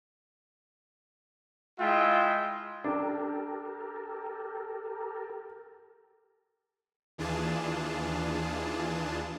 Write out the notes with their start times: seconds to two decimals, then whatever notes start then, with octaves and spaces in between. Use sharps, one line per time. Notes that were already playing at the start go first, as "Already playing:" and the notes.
1.80 G#3 E4 F4 E5 G5
2.84 D4 G4 A4 A#4
7.18 D#2 E3 D4 F4 G#4 A5